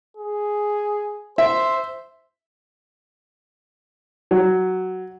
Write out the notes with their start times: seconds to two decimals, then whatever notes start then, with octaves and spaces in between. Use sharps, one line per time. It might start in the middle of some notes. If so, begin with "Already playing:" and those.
0.17 G#4
1.38 C5 E5
4.31 F#3